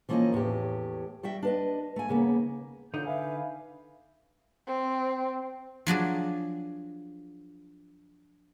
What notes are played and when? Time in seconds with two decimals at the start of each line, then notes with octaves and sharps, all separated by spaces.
0.09 E3 F3 A#3 C#4 A#4 D#5
0.32 E2 A2 C#4 G4
1.23 G3 F#4 E5 G5
1.43 D4 B4 D#5
1.96 A3 G#5
2.08 D#2 C#3 A#3 B3
2.94 C#2 D3 D#4 G6
3.06 B4 E5 F5 G#5
4.67 C4
5.87 F3 F#3 D4 G#4